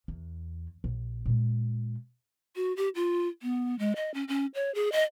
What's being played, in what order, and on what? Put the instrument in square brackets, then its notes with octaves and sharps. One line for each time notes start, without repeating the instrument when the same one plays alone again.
[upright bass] E2
A#1
A#2 G#3
[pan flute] F#4
G4
F4
B3
G#3
D#5
C#4
C#4
C#5
G#4
D#5